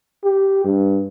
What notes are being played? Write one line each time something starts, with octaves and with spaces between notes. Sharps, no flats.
G4
G2